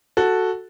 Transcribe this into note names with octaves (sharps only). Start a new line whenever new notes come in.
F#4 A4